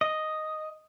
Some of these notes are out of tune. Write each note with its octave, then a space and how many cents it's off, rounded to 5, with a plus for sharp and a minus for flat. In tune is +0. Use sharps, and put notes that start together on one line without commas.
D#5 +0